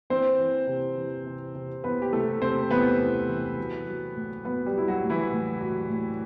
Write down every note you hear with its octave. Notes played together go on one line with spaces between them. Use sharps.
E3 C4 C5
E3
C3
E3
C3
C3
E3 B3 B4
G4
C3 A3 A4
C3 C4 C5
E3 B3 B4
E3
E3
F#3
F#3
A2
F#3 B3 B4
G3 G4
F#3 E4
F#3 F#4
A2
E3 E4
A2
F#3
A2